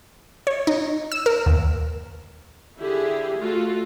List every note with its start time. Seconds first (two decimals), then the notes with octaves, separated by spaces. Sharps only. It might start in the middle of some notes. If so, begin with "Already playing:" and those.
0.47 C#5
0.67 D#4
1.12 E6
1.26 A#4
1.46 D#2
2.79 D3 E4 G4 G#4
3.38 A3 F4 F#4 A4